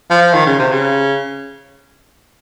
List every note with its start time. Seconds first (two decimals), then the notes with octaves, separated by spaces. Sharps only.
0.10 F3
0.34 D#3
0.47 C#3
0.59 C3
0.72 C#3